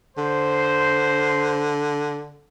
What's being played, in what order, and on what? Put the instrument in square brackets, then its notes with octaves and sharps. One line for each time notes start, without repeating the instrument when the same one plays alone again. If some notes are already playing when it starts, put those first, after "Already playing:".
[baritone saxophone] D3 [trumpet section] C5